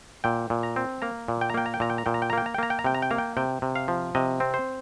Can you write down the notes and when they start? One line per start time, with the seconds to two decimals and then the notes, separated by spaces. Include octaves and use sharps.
0.24 A#2 G5
0.50 A#2
0.63 A#5
0.76 C4
1.02 A#3 A#5
1.28 A#2
1.41 G5
1.50 A#5
1.54 A#3 G5
1.66 A#5
1.74 G5
1.80 A#2 A#5
1.90 G5
1.98 A#5
2.06 A#2 G5
2.14 A#5
2.22 G5
2.30 A#5
2.33 A#3 G5
2.46 A#5
2.54 G5
2.58 A#3 A#5
2.70 G5
2.79 A#5
2.84 C3 G5
2.94 A#5
3.02 G5
3.11 A#3 A#5
3.18 G5
3.37 C3 G5
3.62 C3
3.76 F5
3.88 F3
4.15 C3 D#5
4.40 C4
4.54 C5